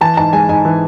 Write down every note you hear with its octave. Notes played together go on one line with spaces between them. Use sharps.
E3 A5
G#2 A5
G#3 G#5
G#2 G#5
E3